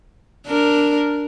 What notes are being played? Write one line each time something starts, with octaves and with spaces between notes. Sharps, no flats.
D4 A#4